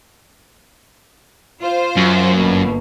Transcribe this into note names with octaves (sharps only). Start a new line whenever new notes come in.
F4 C5
F#2
G1 B2 A#3